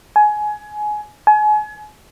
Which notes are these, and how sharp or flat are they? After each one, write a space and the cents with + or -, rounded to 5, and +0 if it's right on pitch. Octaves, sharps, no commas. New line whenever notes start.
G#5 +20
G#5 +35